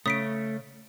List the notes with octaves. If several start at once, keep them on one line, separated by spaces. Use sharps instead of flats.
C#3 A3 D#6 B6 D7